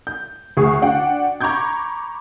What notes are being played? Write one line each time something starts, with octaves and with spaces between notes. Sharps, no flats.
G6
D2 G#4 C#6 C7
D4 F#4 F#5 G5
A#5 B5 C#6 D6 G6 G#6